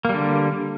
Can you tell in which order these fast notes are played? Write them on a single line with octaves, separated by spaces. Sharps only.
A#3 G3 D3